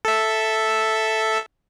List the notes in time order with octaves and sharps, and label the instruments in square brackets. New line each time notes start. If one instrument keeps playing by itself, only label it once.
[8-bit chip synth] A4 E5